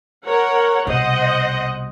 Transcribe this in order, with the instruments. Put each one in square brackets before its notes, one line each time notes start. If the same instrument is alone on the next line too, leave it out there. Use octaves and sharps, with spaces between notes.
[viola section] A#4 C#5 F#5
[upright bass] C2 B2 [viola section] C5 D#5 F#5